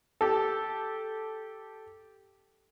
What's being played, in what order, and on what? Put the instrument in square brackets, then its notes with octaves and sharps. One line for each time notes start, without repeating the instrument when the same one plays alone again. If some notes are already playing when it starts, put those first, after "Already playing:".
[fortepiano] G4 A4